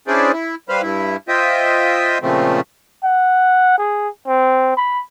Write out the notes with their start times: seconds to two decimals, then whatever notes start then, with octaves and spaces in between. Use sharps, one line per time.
0.07 C#4 D4 E4 G#4 C5 D5
0.32 E4
0.69 G3 B4 C5 F5
0.82 G2 E4
1.28 F4 C5 D#5 E5 G5
2.22 A#2 C#3 F3 A3 C4
3.04 F#5
3.78 G#4
4.27 C4
4.77 B5